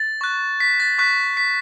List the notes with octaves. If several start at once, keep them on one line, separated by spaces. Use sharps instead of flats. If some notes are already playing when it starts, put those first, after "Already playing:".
Already playing: A6
C#6 F#6
B6
A6
C#6 F#6 B6
B6